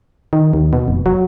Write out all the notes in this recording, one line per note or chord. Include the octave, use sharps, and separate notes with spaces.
D#3
D#2
B2
F1
F#3